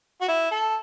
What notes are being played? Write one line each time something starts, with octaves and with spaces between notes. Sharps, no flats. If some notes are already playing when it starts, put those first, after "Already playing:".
F#4
E4
A4